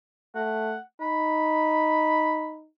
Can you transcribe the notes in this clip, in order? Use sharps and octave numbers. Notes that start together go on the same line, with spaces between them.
A3 F#5
D#4 B5